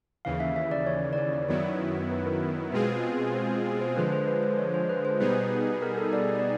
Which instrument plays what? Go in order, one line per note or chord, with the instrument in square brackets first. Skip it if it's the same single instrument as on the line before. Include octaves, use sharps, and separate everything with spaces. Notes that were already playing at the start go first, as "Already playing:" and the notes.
[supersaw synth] D#2 C#3 E3 [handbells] F5
[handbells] E5
E5
D5
C#5
D5
C#5
D5
[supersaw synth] F#2 D#3 F#3 B3 E4 [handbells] C#5
[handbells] B4
A#4
[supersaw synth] B2 G#3 C4 F4 G#4 [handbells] B4
[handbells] C5
C5
[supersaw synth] D3 F3 G#3 [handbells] B4
[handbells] C5
B4
C5
C#5
C5
B4
C5
[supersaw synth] B2 G3 B3 D#4 G#4 [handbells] B4
[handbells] A#4
A4
D5
D5